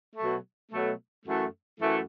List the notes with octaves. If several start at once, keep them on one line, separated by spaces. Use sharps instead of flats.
B2 F#3 A3
B2 F#3 A3
F#2 E3 A3
F#2 E3 A3